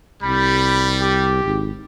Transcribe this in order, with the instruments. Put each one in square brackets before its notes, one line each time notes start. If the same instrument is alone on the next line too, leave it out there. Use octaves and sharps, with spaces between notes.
[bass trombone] C2 [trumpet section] G3 [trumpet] B5
[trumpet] G4
[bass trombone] G#1